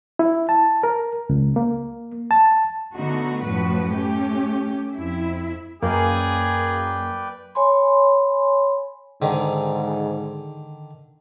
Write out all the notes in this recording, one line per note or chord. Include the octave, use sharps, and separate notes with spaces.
E4
A5
A#4
C#2
A#3
A5
D3 A3 B3 D#4 F#4
F#2 A2 F3 A3 F#4 B4
A3 C#4 G4
F2 E4 E5
F#2 A#3 G#4 B4 D5 G5
C#5 G#5 B5 C6
G#2 D3 D#3